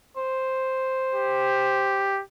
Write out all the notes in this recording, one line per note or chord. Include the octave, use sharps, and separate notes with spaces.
C5
G4